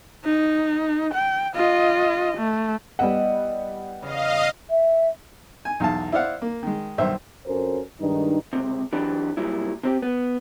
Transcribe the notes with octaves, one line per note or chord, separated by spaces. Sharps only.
D#4
G5
F4 D#5
A3
G3 B3 E4 D#5 E5 F#5
E2 C#3 D#5 F5
E5
G#5
B1 E2 F5 A5
E4 C5 D5 F5 F#5
A#3
D#3 G#3
B1 G2 D#3 C5 E5
F2 C#4 F#4 A4 A#4 C5
G2 D#3 G#3 D4 D#4
C#2 G2 C3
E3 F#3 D4 G4
A#2 F#3 G3 E4
C3 C4 G4
B3